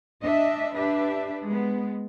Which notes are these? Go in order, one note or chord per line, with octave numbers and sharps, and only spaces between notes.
D4 D#5 E5
D4 G4 B4 E5
G#3 B3